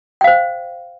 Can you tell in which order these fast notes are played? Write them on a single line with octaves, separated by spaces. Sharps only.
G5 F5 C5